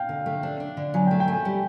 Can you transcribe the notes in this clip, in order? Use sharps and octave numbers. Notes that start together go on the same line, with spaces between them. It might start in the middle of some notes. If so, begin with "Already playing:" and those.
Already playing: F5 G5
D3
A3
D4
D4
D3
F#3 G#5
G5
A3
G5
A3 G#5
G3